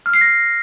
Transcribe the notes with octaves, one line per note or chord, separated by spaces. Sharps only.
F6
C7
A#6